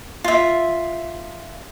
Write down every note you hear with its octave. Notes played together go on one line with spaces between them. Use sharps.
F4 E5